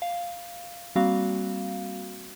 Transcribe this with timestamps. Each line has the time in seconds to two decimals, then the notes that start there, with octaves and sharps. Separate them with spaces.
0.02 F5
0.96 G3 A#3 C4 F#4 F5